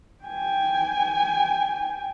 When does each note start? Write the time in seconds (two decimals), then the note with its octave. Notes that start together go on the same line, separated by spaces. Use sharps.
0.24 G5 G#5